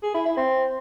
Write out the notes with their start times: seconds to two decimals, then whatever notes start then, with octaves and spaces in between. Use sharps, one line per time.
0.03 G#4
0.14 E4
0.26 E4
0.37 C4